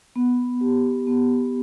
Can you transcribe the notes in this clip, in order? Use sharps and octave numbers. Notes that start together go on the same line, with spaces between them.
B3
G4
B3